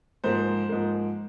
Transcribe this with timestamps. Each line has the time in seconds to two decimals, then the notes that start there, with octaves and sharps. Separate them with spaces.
0.24 G#2 F3 A#3 C5
0.69 G#2 F3 A#3